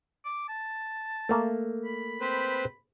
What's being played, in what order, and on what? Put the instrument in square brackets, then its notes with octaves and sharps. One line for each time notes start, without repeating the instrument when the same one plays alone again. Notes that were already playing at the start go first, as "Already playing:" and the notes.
[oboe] D6
A5
[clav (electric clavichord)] A3 A#3
[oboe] B5
[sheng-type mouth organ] C4 B4 C5